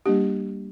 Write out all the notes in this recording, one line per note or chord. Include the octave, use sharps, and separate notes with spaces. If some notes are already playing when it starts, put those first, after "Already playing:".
G3 A#3 D4 G4